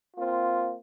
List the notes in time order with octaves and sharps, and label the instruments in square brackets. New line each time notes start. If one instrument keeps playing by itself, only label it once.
[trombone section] A#3 C4 F4